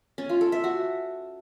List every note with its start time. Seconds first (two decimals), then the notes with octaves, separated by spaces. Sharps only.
0.18 C#4
0.29 F4
0.41 A4
0.52 E5
0.64 F#4